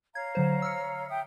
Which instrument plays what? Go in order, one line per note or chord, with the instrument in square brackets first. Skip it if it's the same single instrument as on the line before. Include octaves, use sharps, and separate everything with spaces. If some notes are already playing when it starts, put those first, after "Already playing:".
[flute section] C#5 F5 A#5 [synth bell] G#6
[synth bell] D3 F#3 C5
E6 F6 C#7
[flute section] E5 G5 D#6